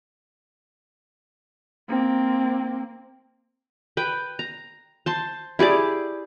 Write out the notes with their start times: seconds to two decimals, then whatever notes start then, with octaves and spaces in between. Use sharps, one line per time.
1.89 A#3 C4
3.97 B4 G5
4.39 A#5
5.06 C5 A5 C6
5.59 E4 G4 G#4 D5